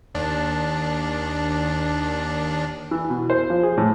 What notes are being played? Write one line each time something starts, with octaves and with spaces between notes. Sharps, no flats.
D#2 D4
E3
B2
C5
F3
G#4
A2